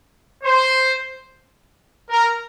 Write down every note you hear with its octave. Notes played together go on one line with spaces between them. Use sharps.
C5
A#4